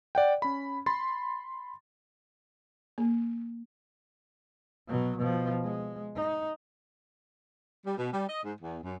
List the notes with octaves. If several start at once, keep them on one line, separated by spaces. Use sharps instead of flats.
D5 F#5 G5
C#4 B5
B5 C6 A6
A#3
B2 F#3
B2 F3
G#3
D#4
G3
B2
G3
D#5
G#2
E2
F#2